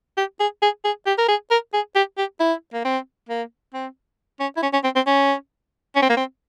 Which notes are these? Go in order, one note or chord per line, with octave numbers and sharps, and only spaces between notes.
G4
G#4
G#4
G#4
G4
A#4
G#4
A#4
G#4
G4
G4
E4
A#3
C4
A#3
C4
C#4
E4
C#4
C#4
C4
C4
C#4
C#4
C4
A#3
C4